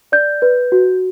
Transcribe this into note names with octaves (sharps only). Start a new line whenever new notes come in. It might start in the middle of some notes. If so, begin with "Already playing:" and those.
D5 G6
B4
F#4